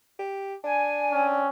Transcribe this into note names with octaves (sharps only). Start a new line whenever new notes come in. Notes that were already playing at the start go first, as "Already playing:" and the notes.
G4
D4 G#5
C4 C#4